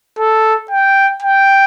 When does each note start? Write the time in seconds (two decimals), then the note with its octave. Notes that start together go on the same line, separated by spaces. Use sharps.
0.18 A4
0.71 G5
1.22 G5